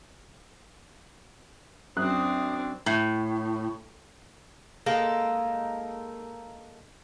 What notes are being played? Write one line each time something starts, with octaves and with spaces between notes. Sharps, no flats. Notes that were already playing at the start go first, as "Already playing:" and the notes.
F#2 C4 D4 D#6 F#6
A2
G#3 A#3 D#4 A4